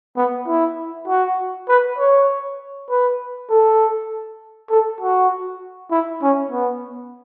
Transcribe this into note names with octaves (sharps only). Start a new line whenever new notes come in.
B3
E4
F#4
B4
C#5
B4
A4
A4
F#4
E4
C#4
B3